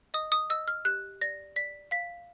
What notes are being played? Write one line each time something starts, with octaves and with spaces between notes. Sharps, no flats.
D#5 D#6
D#6
D#5 E6
F6
G4 F#6
D5 A#6
D5 B6
F5 B6